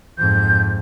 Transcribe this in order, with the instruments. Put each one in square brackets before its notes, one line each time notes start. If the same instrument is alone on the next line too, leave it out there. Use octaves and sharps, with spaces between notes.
[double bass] F2 G#2 [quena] G6